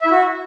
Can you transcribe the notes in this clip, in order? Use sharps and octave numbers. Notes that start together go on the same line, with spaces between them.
E5
E4
F#4